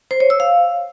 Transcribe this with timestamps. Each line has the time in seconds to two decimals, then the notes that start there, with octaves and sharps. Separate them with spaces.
0.11 C5
0.20 C#5
0.30 E6
0.40 F5